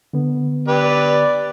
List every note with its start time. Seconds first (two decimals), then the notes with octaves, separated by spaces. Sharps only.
0.13 D3 B3
0.68 G4 B4 D5